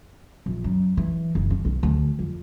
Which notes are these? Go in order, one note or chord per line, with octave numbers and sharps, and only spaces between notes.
A#1
F#2
E3
F#1
D4
B1
D2
F2